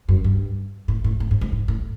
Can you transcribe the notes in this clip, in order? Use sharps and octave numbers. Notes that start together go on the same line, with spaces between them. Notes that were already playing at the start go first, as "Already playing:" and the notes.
F#2
G2
A2
A2
A2
G#2
G#2
A2
A2